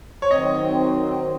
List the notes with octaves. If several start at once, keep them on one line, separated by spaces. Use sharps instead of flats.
C#5
D#3 F#3 C4 D#5